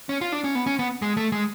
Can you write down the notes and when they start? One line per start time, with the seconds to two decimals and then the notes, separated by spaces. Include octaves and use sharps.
0.09 C#4
0.21 F4
0.32 D4
0.44 C#4
0.55 B3
0.66 C#4
0.79 B3
1.02 G#3
1.17 A3
1.32 G#3